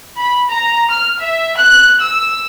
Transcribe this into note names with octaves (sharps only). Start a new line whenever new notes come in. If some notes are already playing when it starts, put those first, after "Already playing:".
B5
A#5
F6
E5
F#6
E6